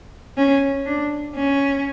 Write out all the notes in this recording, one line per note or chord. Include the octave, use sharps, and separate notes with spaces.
C#4
D4
C#4